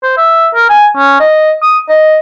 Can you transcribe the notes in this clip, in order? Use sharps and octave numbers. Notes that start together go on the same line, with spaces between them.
C5
E5
A#4
G#5
C#4
D#5
D#6
D#5